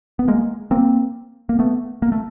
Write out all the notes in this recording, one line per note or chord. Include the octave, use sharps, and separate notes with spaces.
B3
G#3 A#3
A#3 C4
A#3
A3 B3
A#3
A3